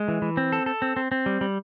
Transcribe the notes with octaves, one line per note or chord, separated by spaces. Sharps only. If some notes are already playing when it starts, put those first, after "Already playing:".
Already playing: G#3
E3
E3
C4
A4
A4
C4
C4
C4
G3
G3